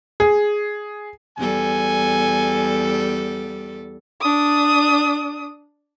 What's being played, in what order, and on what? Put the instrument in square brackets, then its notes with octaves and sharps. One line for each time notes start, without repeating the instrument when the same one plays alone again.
[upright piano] G#4
[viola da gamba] E2 G3 A4 [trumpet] G#5
[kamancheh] D4 D#6